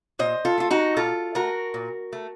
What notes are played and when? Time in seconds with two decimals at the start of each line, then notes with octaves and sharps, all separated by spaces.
0.19 A#2 C5 D#5
0.45 F4 A4
0.58 A3 F4
0.71 D#4 F#4
0.96 A#2 F4 A4
1.35 A3 F#4 A#4
1.74 A#2
2.13 A3